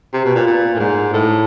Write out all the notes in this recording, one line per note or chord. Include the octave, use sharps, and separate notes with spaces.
C3
B2
A#2
A#2
A2
G#2
A2